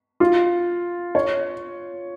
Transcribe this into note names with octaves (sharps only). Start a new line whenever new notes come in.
F4
C#5